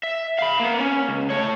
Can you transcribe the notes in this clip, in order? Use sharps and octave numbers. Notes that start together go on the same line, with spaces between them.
E5
F5 B5
A#3 B3
C#4
C#2
A3 C#5